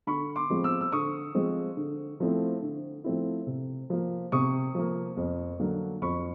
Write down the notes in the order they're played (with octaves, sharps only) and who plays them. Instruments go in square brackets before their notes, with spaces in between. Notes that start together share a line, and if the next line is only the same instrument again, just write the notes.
[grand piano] D3 B5 C#6
C6 D6
F3 G#3 C4
D6 E6
E6
D3 C#6 D#6
F3 G#3 C4
D3
F3 A3 C4 E4
D3
F3 A3 C4 E4
C3
F3 A#3
C3 C#6 D#6
F3 A#3
F2
D3 F#3 A#3 D4
F2 B5 C#6